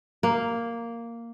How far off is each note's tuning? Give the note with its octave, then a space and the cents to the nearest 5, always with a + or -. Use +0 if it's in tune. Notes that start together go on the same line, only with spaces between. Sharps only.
A#3 -5